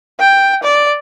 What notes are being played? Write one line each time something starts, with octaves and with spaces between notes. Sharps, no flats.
G5
D5